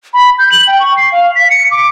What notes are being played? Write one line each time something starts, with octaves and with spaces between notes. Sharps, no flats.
B5
G6
F#7
G5
C#6
C7
F5
B6
C#7
D6